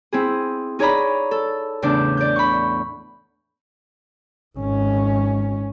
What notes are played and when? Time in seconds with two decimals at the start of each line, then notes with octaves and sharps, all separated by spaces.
0.13 C4 E4 G#4
0.79 D#4 G#4 C#5 D5 A#5 B5
1.31 A4
1.82 E2 A2 C#3 D4 D6 G6
2.17 D5 G6
2.36 B5 C#6
4.57 G#1 C#4